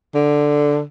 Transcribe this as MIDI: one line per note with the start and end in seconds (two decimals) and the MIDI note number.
0.15 0.83 50